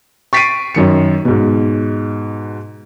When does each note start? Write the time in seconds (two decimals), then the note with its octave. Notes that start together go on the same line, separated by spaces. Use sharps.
0.33 C#6 A6 B6 C7 D7 D#7
0.75 F#2 D#3 C#7
1.25 G#2 B2